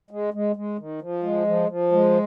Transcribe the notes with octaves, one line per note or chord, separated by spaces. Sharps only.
G#3
G#3
G#3
D#3
F3
G#3
F3
F3
G#3